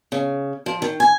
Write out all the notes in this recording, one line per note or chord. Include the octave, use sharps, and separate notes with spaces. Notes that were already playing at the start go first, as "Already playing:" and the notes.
C#3
F3
D#3
G#5